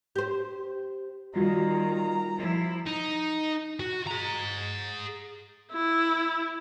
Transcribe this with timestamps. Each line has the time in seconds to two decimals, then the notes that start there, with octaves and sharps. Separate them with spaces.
0.16 G4 C5
1.36 A#2 D#3 G3 F4 F#4 A#5
2.36 F3 E4
2.86 D#4
3.80 F#4
4.07 G#4 A#5
5.72 E4